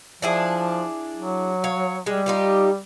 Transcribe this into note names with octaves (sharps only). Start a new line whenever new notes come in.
F3 D4 E4 G#4
F#3
C#5 F5
G3 G#3
D#4 F4 G4